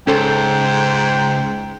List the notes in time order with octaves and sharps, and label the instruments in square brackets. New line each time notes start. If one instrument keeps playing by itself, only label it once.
[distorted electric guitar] C#2 [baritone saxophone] G#2 [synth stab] C#4 A4 C5 [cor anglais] G5